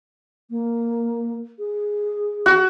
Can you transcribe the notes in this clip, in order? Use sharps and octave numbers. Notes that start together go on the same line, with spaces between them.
A#3
G#4
F#4